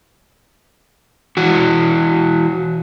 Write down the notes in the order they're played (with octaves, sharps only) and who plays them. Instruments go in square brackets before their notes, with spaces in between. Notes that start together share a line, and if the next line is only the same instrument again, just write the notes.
[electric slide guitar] E3 F#4